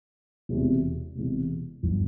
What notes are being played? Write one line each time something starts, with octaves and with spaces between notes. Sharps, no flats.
E1 E2 C3
E1 E2 C3
G1 F3